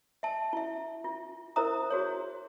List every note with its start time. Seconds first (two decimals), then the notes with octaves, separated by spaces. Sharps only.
0.23 E5 A5
0.53 E4 E5
1.04 F4
1.56 E4 A#4 C5 E5 A#5 D#6
1.90 F#4 G#4 C#5